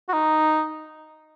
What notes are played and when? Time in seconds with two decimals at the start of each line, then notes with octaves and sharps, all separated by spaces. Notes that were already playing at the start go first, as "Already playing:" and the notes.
0.08 F#4
0.13 D#4